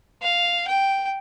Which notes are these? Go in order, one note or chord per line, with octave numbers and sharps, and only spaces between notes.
F5
G5